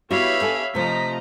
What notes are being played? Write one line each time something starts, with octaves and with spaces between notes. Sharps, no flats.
B3 E4 F#4 G4 C#5 E5 F5 B5
D4 A4 G#5
C3 F3 A3 D#5 A#5 B6